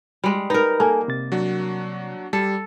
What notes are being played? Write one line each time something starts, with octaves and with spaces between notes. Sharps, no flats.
G3 G#3
D#4 A#4 B4
A#3 A4 G#5
C3 A6
F#3 D4 F#4
G3 A4